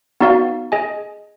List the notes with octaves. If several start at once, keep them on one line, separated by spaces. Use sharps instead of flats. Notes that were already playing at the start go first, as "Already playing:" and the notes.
B3 D#4 F#4 D5 F5
G#4 D#5 G#5